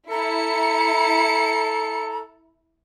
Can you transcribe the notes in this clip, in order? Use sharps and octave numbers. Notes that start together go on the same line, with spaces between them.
E4 A4 A#5 C#7